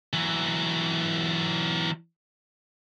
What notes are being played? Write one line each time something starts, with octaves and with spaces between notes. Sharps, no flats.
E3 F#3